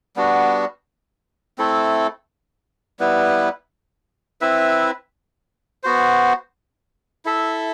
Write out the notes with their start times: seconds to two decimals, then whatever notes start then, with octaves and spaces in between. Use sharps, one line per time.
0.16 G3 B3 D4 F#4
1.58 A3 C4 E4 A4
2.99 G3 B3 E4 B4
4.41 C4 E4 B4 E5
5.83 B3 F#4 C5
7.25 E4 A4 E5